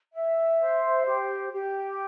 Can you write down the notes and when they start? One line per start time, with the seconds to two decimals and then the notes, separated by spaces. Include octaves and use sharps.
0.14 E5
0.60 C5
1.06 G4
1.52 G4